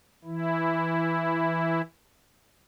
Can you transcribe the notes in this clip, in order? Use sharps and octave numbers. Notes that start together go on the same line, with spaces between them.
E3 E4